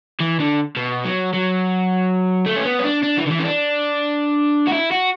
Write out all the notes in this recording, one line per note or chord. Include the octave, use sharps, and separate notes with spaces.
E3
D3
B2
F#3
F#3
A3
C#4
B3
C#4
D4
D4
E3
D3
E3
C#4
D4
F#4
E4
F#4